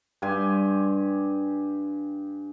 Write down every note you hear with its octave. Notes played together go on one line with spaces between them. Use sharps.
G2 G4 G#5 C6